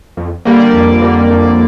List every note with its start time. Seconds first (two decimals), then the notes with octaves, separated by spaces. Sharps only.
0.17 F2
0.45 D3 G3 A#3
0.60 D5
0.73 F2
1.02 D3 G3 A#3
1.30 F2